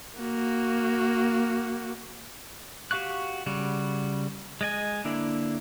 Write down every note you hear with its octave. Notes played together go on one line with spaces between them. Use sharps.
A#3 F#4
F#4 G4 F5 C#6 F#6
C#3 G3 F#4
G#3 D#5 G#5
D3 A#3 D4 E4